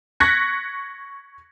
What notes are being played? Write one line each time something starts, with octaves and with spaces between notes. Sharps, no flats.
C#6 F#6 G#6 A#6 B6 C#7